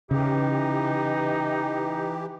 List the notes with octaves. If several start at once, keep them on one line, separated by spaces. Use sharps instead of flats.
C#3 E3 D#4 G4